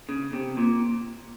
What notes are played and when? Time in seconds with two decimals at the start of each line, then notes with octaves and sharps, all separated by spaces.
0.09 C#3
0.33 C3
0.57 A#2